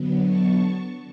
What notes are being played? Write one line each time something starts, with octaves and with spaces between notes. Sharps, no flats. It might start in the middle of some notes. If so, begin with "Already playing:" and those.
Already playing: D3 F#3 B3
A5 C#6